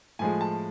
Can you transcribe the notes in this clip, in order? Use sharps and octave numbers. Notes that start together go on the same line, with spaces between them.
A2 F3 G#3 G#5
A5